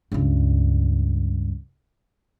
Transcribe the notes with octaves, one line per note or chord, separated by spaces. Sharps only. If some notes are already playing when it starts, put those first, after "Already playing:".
C#2 G2